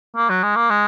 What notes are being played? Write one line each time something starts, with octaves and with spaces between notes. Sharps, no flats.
A#3
F#3
G#3
A#3
G#3